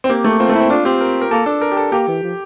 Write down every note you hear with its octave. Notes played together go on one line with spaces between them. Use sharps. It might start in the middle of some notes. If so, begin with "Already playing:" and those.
C4
A#3 G4
A3
C4 F4
A3
E4
C4
D4 F4
C4 G4
A#4
A#4
A#3 A4
D4 A4
A#4
G4
A4
A#3 G4
E3
F3